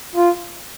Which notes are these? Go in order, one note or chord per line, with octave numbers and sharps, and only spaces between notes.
F4